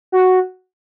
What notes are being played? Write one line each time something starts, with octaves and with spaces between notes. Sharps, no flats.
F#4